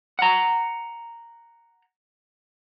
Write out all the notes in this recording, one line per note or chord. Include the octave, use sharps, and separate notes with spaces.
F#5 A#5